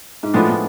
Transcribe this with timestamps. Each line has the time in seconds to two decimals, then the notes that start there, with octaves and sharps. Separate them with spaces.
0.23 G#2
0.34 A2 F3 G#3 B3 D4
0.50 A2